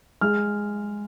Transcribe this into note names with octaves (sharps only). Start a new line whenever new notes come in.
G#3 F6